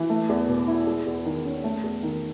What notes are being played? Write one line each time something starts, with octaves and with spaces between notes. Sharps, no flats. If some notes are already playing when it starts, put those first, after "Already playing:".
Already playing: E3
A3
E2
B2
E4
G#3
E2
D#3
C#4
A3
E2
D#3